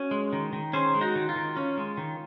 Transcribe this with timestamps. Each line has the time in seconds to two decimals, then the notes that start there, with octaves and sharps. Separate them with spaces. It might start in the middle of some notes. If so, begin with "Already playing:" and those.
Already playing: C#4 F#4
0.11 G#3
0.33 D#3
0.53 D#3
0.73 C#4 G#4 C5
0.94 G#3
1.01 D#4 F#4
1.15 D#3
1.29 F4
1.36 D#3
1.57 C#4
1.77 G#3
1.97 D#3